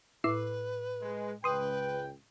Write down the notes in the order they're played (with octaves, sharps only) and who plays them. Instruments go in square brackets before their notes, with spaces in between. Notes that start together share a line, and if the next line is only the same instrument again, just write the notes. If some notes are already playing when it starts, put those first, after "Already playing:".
[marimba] A2 D6 [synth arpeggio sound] E4 E6 C7 [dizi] B4
[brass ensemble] G#3
[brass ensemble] C#2 G5 [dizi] B4 [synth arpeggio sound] C6 D#6